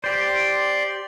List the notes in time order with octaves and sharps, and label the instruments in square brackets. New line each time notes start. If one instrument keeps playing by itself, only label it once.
[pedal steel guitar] G4 C5 [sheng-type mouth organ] D5 C6